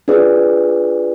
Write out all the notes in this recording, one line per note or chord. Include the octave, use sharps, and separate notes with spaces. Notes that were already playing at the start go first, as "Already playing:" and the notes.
D4 F4 G#4 B4 D5